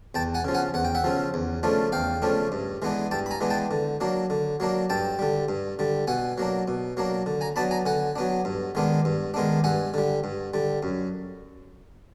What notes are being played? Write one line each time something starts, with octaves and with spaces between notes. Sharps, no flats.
E2 G5 A5
F#5 G#5
C#3 F3
F#5 G#5
E2 F#5
G5
E5 F#5
C#3 F3
E2
C#3 F3 A3 D4
E2 F5 G5
C#3 F3 A3 D4
G2
E3 G#3 B3 D4
G2 G5 A5
B5
G#5 A#5
E3 G#3 B3 D4
G5 A5
D3
F#3 A#3 D4
D3
F#3 A#3 D4
G2 G5 A5
D3 G3
G2
D3 G3
B2 F#5 G#5
F#3 A#3 D4
B2
F#3 A#3 D4
D3
G#5 A#5
F#3 B3 D4 A5 B5
G#5 A#5
D3 F#5 G#5
F#3 B3 D4
G2
D#3 G#3 B3 D4
G2
D#3 G#3 B3 D4
G2 F#5 G#5
D3 G3
G2
D3 G3
F#2